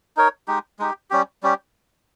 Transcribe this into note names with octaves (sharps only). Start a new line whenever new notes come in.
D#4 A#4 C#5
G#3 D#4 G4
G#3 D#4 G4
G3 C#4 G4
G3 C#4 G4